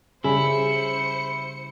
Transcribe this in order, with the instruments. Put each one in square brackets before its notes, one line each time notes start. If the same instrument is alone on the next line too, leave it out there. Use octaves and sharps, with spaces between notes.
[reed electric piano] C#3 G3 [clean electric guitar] E4 [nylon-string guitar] G#4 [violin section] C5 C#7